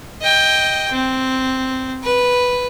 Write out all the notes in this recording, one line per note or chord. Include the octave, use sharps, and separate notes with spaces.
D#5 G5
C4
B4